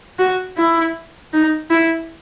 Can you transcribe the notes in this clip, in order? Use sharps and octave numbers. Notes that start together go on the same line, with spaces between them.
F#4
E4
D#4
E4